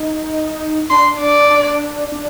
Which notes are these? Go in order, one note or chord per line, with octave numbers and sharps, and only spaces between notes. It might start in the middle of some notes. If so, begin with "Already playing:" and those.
Already playing: D#4
D4 C6
D5
D4
D4